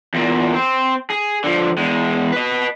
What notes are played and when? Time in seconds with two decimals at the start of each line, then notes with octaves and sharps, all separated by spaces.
0.14 E2 A#2
0.54 C4
1.10 G#4
1.44 D3 F3
1.77 E2 G#3
2.32 B4 D#5